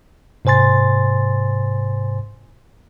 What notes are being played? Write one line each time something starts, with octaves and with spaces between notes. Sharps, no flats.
G#2 C3 C5 G#5 C6 A6